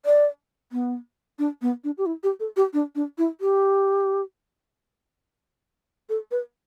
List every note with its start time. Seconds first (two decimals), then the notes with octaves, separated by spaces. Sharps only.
0.06 D5
0.72 B3
1.39 D4
1.62 B3
1.84 D4
1.98 G4
2.06 E4
2.23 G4
2.40 A4
2.56 G4
2.73 D4
2.95 D4
3.18 E4
3.41 G4
6.09 A4
6.31 B4